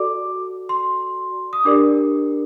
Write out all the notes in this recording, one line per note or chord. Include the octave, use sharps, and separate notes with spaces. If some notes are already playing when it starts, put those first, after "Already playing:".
Already playing: F#4 A4 D5 D6
C6
D#6
D4 G4 A#4 D5 D6